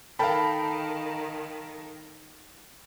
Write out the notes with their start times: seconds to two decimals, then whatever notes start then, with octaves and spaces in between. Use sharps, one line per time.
0.19 D#3 A4 A#4 F5 G5 A5 B5